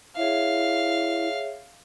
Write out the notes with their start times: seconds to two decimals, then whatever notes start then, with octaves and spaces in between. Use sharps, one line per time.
0.17 E4 G#4 C#5 E5 F5